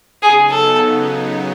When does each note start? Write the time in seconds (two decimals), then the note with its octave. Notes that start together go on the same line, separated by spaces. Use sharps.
0.22 C#3 F#3 B3 D#4 G#4
0.51 A4